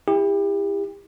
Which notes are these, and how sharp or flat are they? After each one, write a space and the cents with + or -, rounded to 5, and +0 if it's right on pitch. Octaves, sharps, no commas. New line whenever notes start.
E4 +0 G4 +35